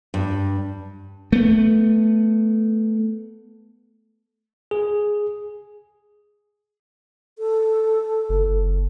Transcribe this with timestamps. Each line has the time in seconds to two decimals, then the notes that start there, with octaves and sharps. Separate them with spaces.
0.14 G2
1.32 A3 B3
4.71 G#4
7.39 A4
8.29 F#1